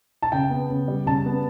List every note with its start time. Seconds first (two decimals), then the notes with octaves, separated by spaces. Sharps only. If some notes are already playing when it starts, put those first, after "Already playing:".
0.22 A5
0.32 C#3 G5
0.50 B3
0.70 C#3
0.88 G3
1.06 C#3 A5
1.26 B3